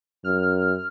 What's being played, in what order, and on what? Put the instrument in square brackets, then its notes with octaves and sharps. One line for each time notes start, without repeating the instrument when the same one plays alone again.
[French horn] F#2 [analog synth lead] F6